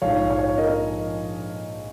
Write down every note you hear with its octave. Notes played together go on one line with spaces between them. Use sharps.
A#1 G#2 F3 C#5 F5
C#5 F5
A#4 D#5